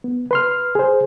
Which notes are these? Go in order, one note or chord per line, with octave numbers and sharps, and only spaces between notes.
B3
B4 C6 F6
G#4 C5